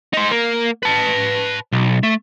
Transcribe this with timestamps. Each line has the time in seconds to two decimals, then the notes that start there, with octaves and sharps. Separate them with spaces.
0.13 D#4 C5
0.31 A#3
0.83 B4 A5
1.72 B1
2.03 A3